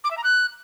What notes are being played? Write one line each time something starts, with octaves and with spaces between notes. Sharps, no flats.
D6
E5
A#5
F#6